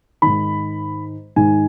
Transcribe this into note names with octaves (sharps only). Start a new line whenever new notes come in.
G#2 D#3 B5
G#2 D#3 G#5